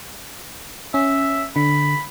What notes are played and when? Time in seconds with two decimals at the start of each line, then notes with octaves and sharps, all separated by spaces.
0.94 C#4 E5
1.56 D3 B5